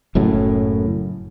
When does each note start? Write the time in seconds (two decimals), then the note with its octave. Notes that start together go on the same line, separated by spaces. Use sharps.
0.15 F#1 F#2 A2